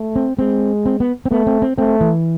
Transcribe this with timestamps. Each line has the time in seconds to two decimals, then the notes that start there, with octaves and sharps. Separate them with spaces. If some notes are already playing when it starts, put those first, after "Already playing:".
Already playing: A3
0.16 C4
0.39 G#3 C4
0.86 C4
1.00 B3
1.26 C4
1.31 A3 B3
1.47 C4
1.62 C4
1.78 A3 C4
2.01 E3